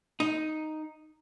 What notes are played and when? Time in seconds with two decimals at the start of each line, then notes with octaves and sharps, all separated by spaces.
0.20 D#4